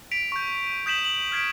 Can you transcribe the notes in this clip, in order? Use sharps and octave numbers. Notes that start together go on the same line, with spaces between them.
B6 D7 F7
C#6 G6
D#6 G6 B6 E7 F#7
F#7
F6 G#6 B6 D7